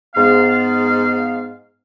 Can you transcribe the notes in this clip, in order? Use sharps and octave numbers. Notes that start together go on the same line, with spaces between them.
G#2 B3 F5